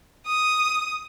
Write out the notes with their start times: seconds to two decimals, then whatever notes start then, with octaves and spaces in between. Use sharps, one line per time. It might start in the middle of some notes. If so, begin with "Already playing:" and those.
0.26 D#6